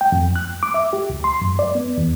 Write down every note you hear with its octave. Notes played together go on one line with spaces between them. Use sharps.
G5
F2
F#6
D6
E5
G4
C#2
C6
F#2
D5
B3
E2